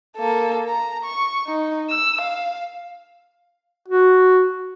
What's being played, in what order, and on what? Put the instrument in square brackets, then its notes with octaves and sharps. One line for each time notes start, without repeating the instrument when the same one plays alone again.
[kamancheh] A#3 A4
A#5
C#6
D#4
E6
F5
[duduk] F#4